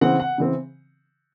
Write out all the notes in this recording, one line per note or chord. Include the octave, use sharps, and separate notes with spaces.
C#3 E3 C4 F#5
F#5
C#3 E3 C4